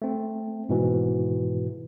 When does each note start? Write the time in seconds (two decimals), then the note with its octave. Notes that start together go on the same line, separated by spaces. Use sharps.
0.02 A3 C4
0.69 G#2 B2 E3